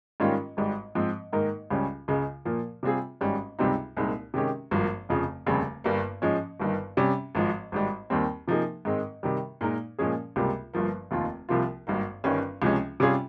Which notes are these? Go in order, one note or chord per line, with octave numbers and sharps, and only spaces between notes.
G#2 D#3 G3 C#4 F4
G#1 G#2 G3
G#2 F3 C4
G#2 D#3 A#3 D#4 A#4
C#2 C#3 G3 C#4
C#2 C#3 G#3
A#2 F3 A#3
C3 G3 C4 F4 G#4
G#1 G#2 G3 C#4
C#2 C3 G3 C4 D#4
C2 A#2 G#3 C4 D#4
C3 D#3 G#3 C#4 G4
G#1 G2 F3 A#3
F1 F2 C#3 F3
F1 D#2 C#3 G3 C4
G1 G2 G3 A#3
G#2 F3 G#3 C#4
G1 G2 D#3
C3 G3 C#4
G#1 G#2 F3
G#1 G#2 G3
D#2 D#3 G3 C4
C3 F3 A#3 D#4 G#4
G#2 D#3 G#3 C4
C3 D#3 G3
A#2 G#3 D#4 A#4
A#2 F3 G#3 C#4 G#4
C#2 C3 G3 A#3 F4
G1 G2 F3 A#3
F1 D#2 D#3 A#3 F4
C2 C3 F3 A#3 F4
G#1 G2 D#3 A#3
G1 G2 D#3 G3 C#4
C#2 C3 F3 G#3 C#4
C3 G3 C#4 F4 G#4